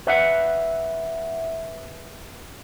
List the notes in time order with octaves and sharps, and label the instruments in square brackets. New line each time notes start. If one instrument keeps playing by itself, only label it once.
[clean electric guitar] B4 E5 F#5